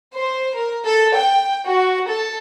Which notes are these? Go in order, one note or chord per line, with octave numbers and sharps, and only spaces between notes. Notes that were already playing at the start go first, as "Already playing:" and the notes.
C5
A#4
A4
G5
F#4
A4